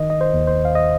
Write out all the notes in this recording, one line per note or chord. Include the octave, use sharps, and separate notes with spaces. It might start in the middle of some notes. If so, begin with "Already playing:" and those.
Already playing: D#3 D#5
D#5
C5
D#2
C5
F5
D#5